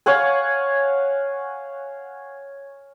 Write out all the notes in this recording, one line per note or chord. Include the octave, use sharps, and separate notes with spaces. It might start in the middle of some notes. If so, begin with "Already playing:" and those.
C#5 F5 F#5 G#5